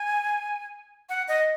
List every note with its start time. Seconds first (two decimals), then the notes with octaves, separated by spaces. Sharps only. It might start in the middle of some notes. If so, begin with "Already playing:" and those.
Already playing: G#5
1.09 F#5
1.28 D#5